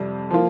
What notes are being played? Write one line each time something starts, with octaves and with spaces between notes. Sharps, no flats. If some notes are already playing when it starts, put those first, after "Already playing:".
Already playing: F2 C3 G3
F3 A#3 F4